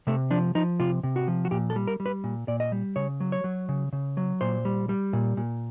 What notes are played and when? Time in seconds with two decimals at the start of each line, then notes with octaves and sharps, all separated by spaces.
0.07 C3 A3
0.31 F3 D4
0.55 F3 D#4
0.80 C3 F4
1.03 C3
1.16 F#4
1.28 F3
1.45 F#4
1.51 A#2 G4
1.70 A4
1.76 G3
1.87 A#4
2.00 G3
2.06 B4
2.24 A#2
2.48 A#2 D5
2.60 D#5
2.72 G3
2.96 C#3 C#5
3.20 F#3
3.32 C#5
3.44 F#3
3.69 C#3
3.93 C#3
4.17 F#3
4.41 A#2 C5
4.65 G3
4.89 G3
5.13 A#2
5.37 A#2